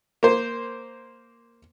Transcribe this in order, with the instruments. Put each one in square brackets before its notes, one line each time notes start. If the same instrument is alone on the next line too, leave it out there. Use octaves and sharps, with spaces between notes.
[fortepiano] A#3 C5